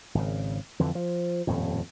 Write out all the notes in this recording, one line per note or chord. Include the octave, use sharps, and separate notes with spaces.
G#1 C#3
F2 D3 E3
F3
D#1 F2 A2